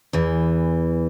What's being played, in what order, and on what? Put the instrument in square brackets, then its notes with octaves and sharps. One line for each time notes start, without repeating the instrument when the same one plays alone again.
[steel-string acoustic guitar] E2 E3